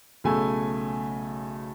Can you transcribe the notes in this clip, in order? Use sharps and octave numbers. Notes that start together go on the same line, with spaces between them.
B1 C#3 A3 G#5 E6